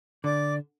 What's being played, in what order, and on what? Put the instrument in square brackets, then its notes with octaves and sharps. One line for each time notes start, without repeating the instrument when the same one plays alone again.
[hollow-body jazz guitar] D3 [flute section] D5 D6